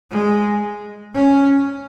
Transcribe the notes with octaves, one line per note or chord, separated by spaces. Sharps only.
G#3
C#4